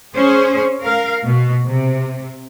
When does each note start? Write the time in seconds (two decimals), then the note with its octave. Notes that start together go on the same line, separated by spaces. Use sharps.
0.13 C#4 G#4 C5
0.82 A#4 F5
1.25 B2
1.65 C3